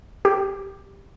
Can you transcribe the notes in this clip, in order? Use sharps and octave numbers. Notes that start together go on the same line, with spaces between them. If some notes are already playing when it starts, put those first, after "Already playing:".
G4